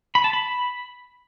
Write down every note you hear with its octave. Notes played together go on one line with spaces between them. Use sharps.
B5
A5
B5